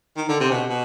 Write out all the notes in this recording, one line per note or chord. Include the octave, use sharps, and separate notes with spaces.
D#3
D3
C3
B2
B2